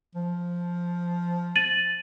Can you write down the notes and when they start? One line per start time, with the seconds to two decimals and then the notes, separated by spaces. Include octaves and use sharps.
0.15 F3
1.56 A6 D#7 F#7